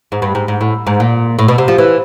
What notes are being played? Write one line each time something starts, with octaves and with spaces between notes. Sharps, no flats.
G#2
G2
G#2
G#2
A2
G#2
A#2
A2
B2
C3
F3
E3